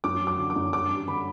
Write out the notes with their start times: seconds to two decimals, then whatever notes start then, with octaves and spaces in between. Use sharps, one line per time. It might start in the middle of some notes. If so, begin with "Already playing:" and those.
0.04 F#2 D6
0.21 F#3
0.27 D6
0.38 D3
0.50 D6
0.56 F#2
0.73 G2 D6
0.91 G3
1.08 D3 B5